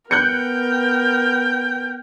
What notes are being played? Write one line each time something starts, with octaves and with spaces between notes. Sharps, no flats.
B3 A#4 G5 F#6 G6 C#7